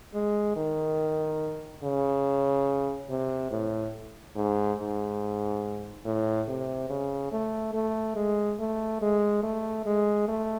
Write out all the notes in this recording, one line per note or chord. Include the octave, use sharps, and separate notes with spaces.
G#3
D#3
C#3
C3
A2
G#2
G#2
A2
C3
C#3
A3
A3
G#3
A3
G#3
A3
G#3
A3